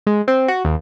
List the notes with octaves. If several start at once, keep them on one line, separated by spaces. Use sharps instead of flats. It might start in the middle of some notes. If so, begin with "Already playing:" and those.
G#3
C4
F#4
D#2